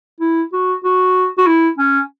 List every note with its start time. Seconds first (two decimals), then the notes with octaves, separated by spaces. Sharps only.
0.20 E4
0.53 F#4
0.84 F#4
1.38 F#4
1.47 E4
1.78 C#4